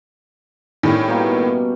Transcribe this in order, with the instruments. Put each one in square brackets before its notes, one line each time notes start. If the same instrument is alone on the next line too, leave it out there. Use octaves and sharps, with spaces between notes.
[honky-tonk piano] A2 D#3 [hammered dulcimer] G3 C#4
[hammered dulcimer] B2 G3 A#3